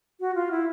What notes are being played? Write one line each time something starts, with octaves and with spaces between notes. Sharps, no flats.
F#4
F4
E4